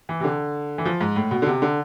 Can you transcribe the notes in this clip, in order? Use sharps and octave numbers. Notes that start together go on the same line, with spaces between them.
E3
C3
D3
E3
F3
G#2
A2
B2
D3
C3
D3